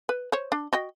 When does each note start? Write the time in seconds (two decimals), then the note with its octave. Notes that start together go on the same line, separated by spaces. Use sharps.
0.09 B4
0.32 C5 C#5
0.52 D4
0.73 F#4 D#5 G5